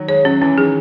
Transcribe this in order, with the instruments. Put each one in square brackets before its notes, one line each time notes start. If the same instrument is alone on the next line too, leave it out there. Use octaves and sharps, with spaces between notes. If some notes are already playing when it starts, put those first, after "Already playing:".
Already playing: [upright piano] D#3 F#3
[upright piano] G#3 [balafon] C#5
[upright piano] F#3 [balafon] C#4
[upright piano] E3 [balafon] C#4
[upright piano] D#3 [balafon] G#4